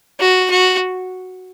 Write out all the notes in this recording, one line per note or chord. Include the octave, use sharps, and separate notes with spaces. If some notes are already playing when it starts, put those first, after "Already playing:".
F#4
F#4